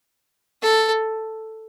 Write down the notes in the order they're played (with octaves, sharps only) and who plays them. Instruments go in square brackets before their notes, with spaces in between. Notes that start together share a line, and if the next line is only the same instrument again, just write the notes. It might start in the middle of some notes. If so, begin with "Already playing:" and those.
[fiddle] A4